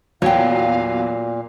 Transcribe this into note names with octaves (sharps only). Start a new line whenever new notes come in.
E2 A#2 F#3 C#5 F5 G5